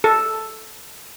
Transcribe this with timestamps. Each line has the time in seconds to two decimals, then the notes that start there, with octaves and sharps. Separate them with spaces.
0.04 A4